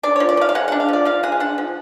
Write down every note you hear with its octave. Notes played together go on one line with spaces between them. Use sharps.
D4 D5
F3 C#5
D5
F3 F5
F5
G#3 F#5
D4 F#5
F5
F3 D5
F3 F5
G#3 F#5
G#5
D4 F#5
F3